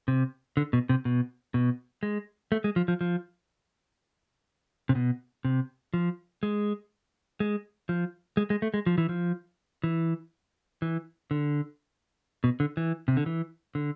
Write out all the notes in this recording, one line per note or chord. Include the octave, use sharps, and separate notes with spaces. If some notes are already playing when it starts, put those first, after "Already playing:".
C3
D3
B2
C3
B2
B2
G#3
A3
G#3
F3
F3
F3
C3
B2
C3
F3
G#3
G#3
F3
G#3
G#3
A3
G#3
F3
E3
F3
E3
E3
D3
B2
D3
E3
C3
D3
E3
D3